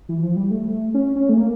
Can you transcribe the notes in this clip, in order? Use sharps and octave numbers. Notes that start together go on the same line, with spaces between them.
E3
F3
G3
A3
C#4
C#4
A3
A#3